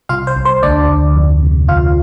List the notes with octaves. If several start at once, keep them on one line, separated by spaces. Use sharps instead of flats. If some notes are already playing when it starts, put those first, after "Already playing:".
C2 F4 F5
C5
C2
C5
D2 D4 D5
D2
F2
C3
D2 F4 F5